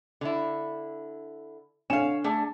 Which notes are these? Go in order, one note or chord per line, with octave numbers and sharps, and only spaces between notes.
D3 E4
D3 C#5 F5 G#5 E7
A3 D4 G#4